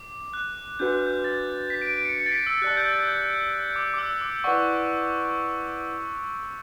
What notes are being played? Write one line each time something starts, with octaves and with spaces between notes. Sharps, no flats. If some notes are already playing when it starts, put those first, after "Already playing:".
Already playing: D6
F#6
D4 F#4 B4 G6
F#6
G6
A6
B6
D7
D7
C#7
C#7
A6
B6
E6
G4 D5 A5 F#6
G6
A6
G6
D6
D6
E6
D6
E4 B4 D5 F#5 C#6